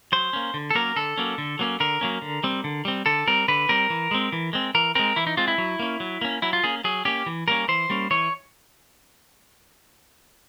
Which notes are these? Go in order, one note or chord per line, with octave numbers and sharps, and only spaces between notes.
F#3 C5
A#3 C#4
D3
A4
F#3 A#3 C#4 A#4
D3 A4
F#3 A#3 C#4
D3
F#3 A#3 C#4
D3 A#4
F#3 A#3 C#4
D3
G3 C4
D3
G3 C4
D3 A4
G3 C4 A#4
D3 B4
G3 C4 A#4
E3
G#3 C4
E3
G#3 C4
E3 A#4
G#3 C4 A#4
E3 E4
D#4
G#3 C4 F4
E4
F#3
A#3 C#4
F#3
A#3 C#4
F#3 E4
F4
A#3 C#4 G#4
F#3 G#4
A#3 C#4 G4
E3
G3 A#3 C#4 A#4
E3 C5
G3 A#3 C#4
E3 C#5